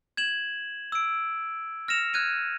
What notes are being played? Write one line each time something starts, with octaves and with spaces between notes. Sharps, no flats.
G#6 E7 F#7
E6 D7
F6 A#6 C#7 E7 F7
F6 F#6 G#6 D#7 E7